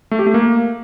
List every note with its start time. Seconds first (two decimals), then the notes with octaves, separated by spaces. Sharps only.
0.11 A3
0.19 G4
0.27 A3
0.34 A#3